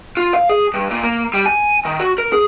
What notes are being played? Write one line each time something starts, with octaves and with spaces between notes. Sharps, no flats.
F4
F5
G#4
G2
A#2
A#3
G3
G#5
D#3
F#4
A#4
G#4